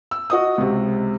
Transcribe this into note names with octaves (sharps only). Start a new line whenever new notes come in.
E6
F#4 D#5 D#6
C#2 C3